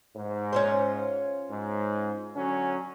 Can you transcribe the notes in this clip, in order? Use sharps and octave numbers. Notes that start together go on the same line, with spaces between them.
G#2
C#4 F4 C5
G#2
D3 F#3 C#4